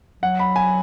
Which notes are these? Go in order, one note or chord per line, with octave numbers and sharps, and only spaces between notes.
F#3 F#5
B5
G#5